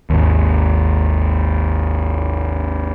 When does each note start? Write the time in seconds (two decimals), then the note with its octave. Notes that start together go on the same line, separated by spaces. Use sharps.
0.10 G#1 D#2